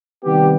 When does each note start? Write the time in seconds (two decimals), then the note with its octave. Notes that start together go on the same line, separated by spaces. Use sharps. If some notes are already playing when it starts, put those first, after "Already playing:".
0.24 C3 D#3 G3 B3 G4